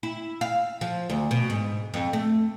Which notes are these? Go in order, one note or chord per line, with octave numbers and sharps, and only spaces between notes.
E4
F5
F3
D2
B2
G#2
F2
A3